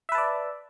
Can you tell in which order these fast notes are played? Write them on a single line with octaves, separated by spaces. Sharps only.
E5 B4 A5 D5